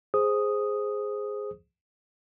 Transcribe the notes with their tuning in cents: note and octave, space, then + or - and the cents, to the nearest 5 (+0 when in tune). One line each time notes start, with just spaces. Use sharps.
G#4 +0 C5 +0 D#6 +0